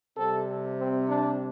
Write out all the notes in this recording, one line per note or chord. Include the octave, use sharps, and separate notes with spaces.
C3 G3 C4 A4
C4
D4